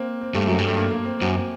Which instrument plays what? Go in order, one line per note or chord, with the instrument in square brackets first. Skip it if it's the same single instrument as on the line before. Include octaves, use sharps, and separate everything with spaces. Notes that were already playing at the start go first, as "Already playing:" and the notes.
Already playing: [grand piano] A#3 C4
C4
[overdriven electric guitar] G2 [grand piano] A3
[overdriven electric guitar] F#2 [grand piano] F#3
[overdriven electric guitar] G2
[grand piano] A3
A#3
A#3
C4
[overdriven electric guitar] F#2 [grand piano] C4
[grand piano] C4